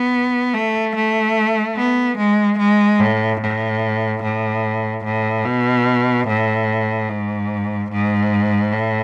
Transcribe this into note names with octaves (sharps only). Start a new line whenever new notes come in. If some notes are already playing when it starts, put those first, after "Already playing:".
Already playing: B3
A3
A3
B3
G#3
G#3
A2
A2
A2
A2
B2
A2
G#2
G#2
A2